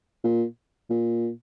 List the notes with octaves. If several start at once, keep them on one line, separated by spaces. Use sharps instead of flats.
A#2
A#2